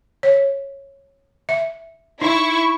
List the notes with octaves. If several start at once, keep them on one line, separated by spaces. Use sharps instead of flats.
C#5
E5
D#4 E4 C#6